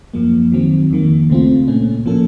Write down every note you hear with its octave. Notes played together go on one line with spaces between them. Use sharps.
F#2 F3 A#3
D#3 F#3 C4
F2 D#3 A#3
C#2 C#3 A3 C4 F4
A#2 A3 C#4
A2 F3 A#3 C#4 A4